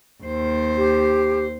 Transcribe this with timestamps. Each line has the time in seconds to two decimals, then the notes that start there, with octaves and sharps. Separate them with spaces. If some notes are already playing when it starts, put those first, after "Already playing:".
0.23 D#2 C5
0.77 G4